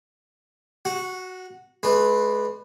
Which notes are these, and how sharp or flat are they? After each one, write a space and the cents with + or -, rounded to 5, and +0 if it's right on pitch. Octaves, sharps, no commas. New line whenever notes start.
F#4 +0 F#5 -25
G#3 +35 D4 +45 B4 +0